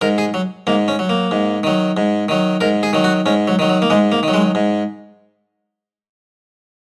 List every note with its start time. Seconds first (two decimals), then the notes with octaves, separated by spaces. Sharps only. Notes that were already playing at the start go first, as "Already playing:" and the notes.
0.02 G#2 A#4
0.18 G#4
0.34 F#3
0.67 G#2 A#3
0.88 C#4
0.99 F#3
1.09 A#3
1.31 G#2
1.63 D#3 F#3
1.97 G#2
2.29 D#3 F#3
2.61 G#2 A#4
2.83 G#4
2.93 D#3 F#3
3.04 F#4
3.26 G#2 C#4
3.48 F#3
3.59 D#3 F#3
3.69 F#3
3.82 A#3
3.90 G#2 G#3
4.12 A#3
4.23 D#3 F#3
4.34 G#3
4.55 G#2